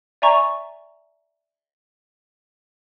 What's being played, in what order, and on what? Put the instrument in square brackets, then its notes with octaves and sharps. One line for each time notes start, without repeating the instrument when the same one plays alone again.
[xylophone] D5 E5 G#5 A#5 C#6